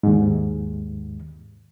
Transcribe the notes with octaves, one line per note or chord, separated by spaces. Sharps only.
D#2 G#2